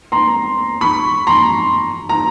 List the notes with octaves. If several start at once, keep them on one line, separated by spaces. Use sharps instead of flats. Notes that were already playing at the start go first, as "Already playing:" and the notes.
A#5 C6
B5 C#6
A#5 C6
A#5